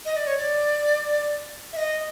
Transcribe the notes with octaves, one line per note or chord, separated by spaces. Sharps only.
D#5
D5
C#5
D5
E5
D#5